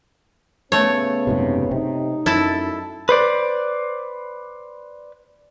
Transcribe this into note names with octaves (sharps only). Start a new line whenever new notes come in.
C#3 A3 B3 C#4 C#5
F#1 G#2 C3
C3 D#4
F#2 E4 A4 A5
B4 C5 D5